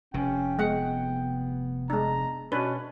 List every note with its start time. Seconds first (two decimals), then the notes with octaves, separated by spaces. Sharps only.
0.14 F1 C3 C#4 G5
0.59 G#3 B3 F#5
1.90 G#3 D4 A#5
2.52 B2 C#4 D4 B4